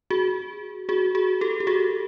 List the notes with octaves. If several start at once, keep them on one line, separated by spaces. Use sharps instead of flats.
F#4 G#4
F#4 G#4
F#4 G#4
G4 A4
G4
F#4 G#4